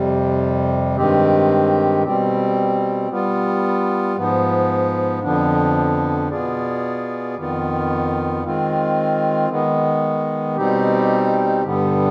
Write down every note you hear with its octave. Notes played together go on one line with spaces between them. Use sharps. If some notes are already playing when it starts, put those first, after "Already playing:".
Already playing: F2 C3 G3
G2 D#3 G#3 C4 G4
B2 G3 C4
G3 B3 F4
G#2 F3 B3
F2 D3 F3 B3 D4
B2 B3 F4 G#4 D5
F2 D#3 B3 F4
D#3 G#3 C4 F4
D#3 G#3 B3
B2 G3 C4 D#4 G4
G2 D3 G3 B3